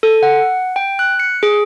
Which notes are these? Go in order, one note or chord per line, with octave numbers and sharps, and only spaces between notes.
A4
F#5
G5
F#6
C#7
G#4